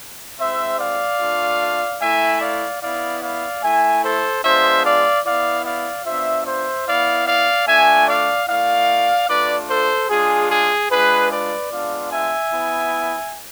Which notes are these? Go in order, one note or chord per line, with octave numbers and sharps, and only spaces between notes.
G#3 C4 E4 C5 E5
D5 F5
A3 D4 F4
A3 E4 E5 G#5
D5 F5
B3 E4 D5 F5
D5 F5
A3 E4 E5 G#5
A4 C5
G#3 B3 D4 F4 C5 E5
D5 F5
B3 E4 D5 F5
D5 F5
B3 D4 F4 C5 E5
C5 E5
B3 E4 D5 F5
D5 F5
A3 D4 F4 E5 G#5
D5 F5
A3 E4 D5 F5
A3 D4 F4 B4 D5
A4 C5
G#3 D4 F4 G#4
G#4
G#3 D4 F4 G#4 B4
B4 D5
G#3 B3 D4 F4 D5 F5
E5 G#5
B3 E4